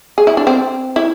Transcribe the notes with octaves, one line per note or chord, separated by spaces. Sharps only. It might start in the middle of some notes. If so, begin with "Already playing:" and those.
G#4
E4
D4
C4
E4